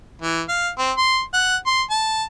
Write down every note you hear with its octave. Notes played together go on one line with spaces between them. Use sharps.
E3
F5
C4
C6
F#5
C6
A5